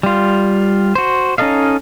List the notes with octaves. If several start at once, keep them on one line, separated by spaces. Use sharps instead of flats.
G3 F4
F#4 C5
C#4 D#4 A4 D#5 F5